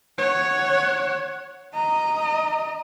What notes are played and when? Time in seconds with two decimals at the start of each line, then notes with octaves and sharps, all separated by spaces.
0.18 C#5 F#5
1.75 D#5 A#5